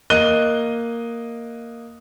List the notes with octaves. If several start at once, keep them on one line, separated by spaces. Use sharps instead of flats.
A#3 D#5 F#6 D#7 G7